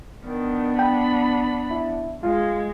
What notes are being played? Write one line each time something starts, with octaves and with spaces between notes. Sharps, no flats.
D#3 B3 D4
G5 B5
E4
G#3 F4